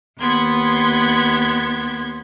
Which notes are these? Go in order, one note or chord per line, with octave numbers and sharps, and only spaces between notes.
D#2 B3 C6 G#6